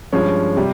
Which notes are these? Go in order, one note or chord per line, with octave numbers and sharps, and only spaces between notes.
G2 F3 G#3 C#4
C3 G3